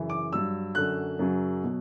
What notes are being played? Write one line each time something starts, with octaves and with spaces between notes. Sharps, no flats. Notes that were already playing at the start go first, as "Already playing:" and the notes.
Already playing: F#2 C#3 E3
D6
G2 F#3 E6
F#2 D3 F#3 F#6
F#2 C#3 F#3
B2 F#3